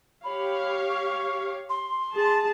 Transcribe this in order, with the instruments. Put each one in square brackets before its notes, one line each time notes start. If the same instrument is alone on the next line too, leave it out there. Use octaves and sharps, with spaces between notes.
[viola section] G4 C#5 F5 [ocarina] B5
[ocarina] C#6
C6
[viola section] G#4 A5